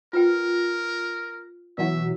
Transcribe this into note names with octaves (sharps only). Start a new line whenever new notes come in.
F4 A#4 B4 G5
B2 E3 F#3 E5